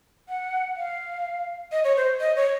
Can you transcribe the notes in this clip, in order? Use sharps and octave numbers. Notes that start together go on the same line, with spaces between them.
F#5
F5
D#5
C#5
C5
D#5
C#5